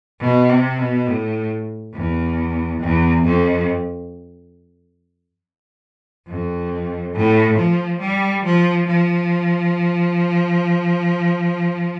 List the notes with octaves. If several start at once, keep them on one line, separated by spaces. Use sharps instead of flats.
B2
C3
B2
A2
E2
E2
F2
F2
A2
F3
G3
F3
F3